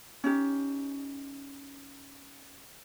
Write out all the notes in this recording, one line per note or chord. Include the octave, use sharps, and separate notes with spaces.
C#4 D#4 G4